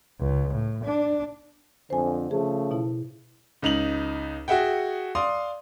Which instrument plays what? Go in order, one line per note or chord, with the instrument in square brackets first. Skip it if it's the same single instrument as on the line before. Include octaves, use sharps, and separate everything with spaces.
[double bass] C#2
A2
D4
[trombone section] F2 D3 [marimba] C5 G#5
[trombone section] C#3 F3 A3 [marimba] G#4
[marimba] B2 E4
[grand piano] C#2 D#4 F7 F#7
F#4 G#4 E5 F#5 G5
D5 F5 C6 D#6